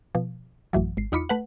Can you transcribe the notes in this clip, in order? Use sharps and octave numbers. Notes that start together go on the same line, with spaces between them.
B2 F3
A1 F#2 E3 F#3
G#1 C7
E2 D#4 F4 B5 D6 C#7
A3 B4 F#5